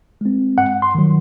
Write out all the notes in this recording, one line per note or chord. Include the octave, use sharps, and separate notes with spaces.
G#3 C4
G2 F#5
C6
D#3 F#3